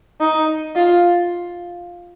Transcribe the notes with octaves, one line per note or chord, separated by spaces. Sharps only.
D#4
F4